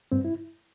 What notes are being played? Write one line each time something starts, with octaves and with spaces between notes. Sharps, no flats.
G2 C4
E4